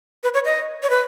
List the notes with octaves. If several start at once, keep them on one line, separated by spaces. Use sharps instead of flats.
B4
C#5
D#5
C#5
B4